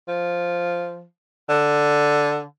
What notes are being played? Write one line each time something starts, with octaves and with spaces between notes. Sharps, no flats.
F3
D3